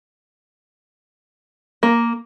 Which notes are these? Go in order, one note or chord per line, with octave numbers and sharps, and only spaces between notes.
A#3